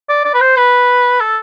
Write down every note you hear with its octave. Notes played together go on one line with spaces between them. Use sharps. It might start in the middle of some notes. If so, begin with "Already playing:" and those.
D5
D5
B4
C5
B4
A4